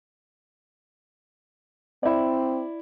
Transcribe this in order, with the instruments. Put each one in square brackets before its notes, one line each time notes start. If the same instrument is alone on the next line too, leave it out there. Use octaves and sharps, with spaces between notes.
[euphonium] C4 [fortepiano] E4 D5